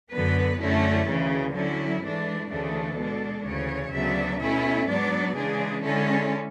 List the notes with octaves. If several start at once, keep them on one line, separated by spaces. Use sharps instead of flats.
F#2 D3 F#3 B3 B4
F#2 D3 A3 C#4 E4
D2 C#3 E3
D3 F#3 C#4 E4
G#2 E3 A3 D4
D2 C#3 E3 A3 D4 A4
B2 G#3 D4
D2 C#3 E3 C#5
D2 C#3 F#3 B3 D4 E5
B2 A3 C#4 E4 E5
G#2 F#3 B3 D4 D5
C#3 E3 G#3 D4 G#4
D3 G#3 C#4 E4 A4